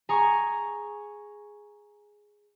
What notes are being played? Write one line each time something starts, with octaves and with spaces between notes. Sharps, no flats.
G#4 G#5 A#5 C#6